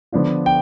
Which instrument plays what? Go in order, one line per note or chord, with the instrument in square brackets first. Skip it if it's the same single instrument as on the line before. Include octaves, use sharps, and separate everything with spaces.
[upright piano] D3 F3 B3 D4 F4
[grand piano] G5